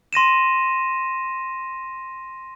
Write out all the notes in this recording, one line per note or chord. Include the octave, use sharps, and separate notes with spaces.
C6 A#6 D#7 E7